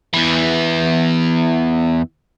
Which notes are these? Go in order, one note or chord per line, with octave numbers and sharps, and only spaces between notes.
E2 E3